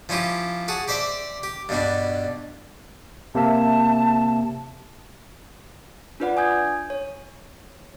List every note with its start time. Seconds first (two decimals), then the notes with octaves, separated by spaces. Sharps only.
0.09 F3 C#4 E4 F4 G4
0.68 F#4 G#4 A5 D#6
0.88 G4 C5 D5 E5
1.43 G4
1.69 G2 B2 G3 D4
3.35 C3 A#3 E5 A5
6.20 D4 F4 B4 D5 F#5
6.37 G#5 D#6 G6 G#6
6.90 C#5